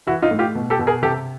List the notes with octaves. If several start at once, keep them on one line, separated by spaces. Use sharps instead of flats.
E3 E4 F#4
D#4 F4
A2
F4 G4
B2
G4 A4
B2
G#4 A#4
C3 G4 A4